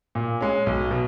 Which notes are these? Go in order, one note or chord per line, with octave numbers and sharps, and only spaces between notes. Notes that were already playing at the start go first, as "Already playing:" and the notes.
A#2
G#3 C#4
B1
B2